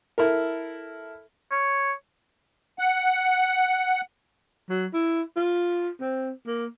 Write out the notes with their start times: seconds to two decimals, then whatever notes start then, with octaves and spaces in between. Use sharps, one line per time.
0.18 E4 A4 A#4
1.51 C#5
2.79 F#5
4.70 F#3
4.94 E4
5.37 F4
6.01 C4
6.47 A#3